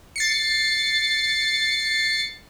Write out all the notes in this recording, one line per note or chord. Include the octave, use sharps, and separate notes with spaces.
A6 C7 C#7